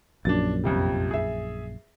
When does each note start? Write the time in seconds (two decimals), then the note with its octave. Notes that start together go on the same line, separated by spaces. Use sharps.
0.25 A#1 F#2 D4 A6
0.64 F2 C3 G3
1.11 G#4 E5